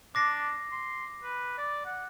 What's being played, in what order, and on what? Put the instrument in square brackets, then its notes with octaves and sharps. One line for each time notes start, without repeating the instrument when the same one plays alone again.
[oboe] D4 [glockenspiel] D6 A#6 C7
[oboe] C6
B4
D5
F#5